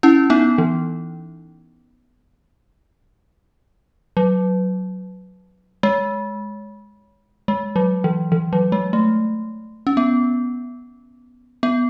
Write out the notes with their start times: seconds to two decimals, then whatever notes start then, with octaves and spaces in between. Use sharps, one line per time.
0.03 C#4 E4
0.30 B3 D#4
0.58 E3
4.17 F#3
5.83 G#3
7.48 G#3
7.76 F#3
8.04 E3
8.32 E3
8.53 F#3
8.72 G#3
8.93 A3
9.87 C#4
9.97 B3
11.63 B3